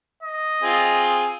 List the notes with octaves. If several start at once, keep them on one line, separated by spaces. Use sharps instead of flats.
D#5
C4 F4 G#4